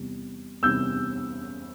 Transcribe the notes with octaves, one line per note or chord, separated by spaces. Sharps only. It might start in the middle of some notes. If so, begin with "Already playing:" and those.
Already playing: E2 C3 G3
E2 C3 G3 E6 G6